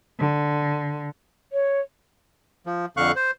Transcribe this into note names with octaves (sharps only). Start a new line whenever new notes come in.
D3
C#5
F3
F2 D3 F5 C#6 F#6
C5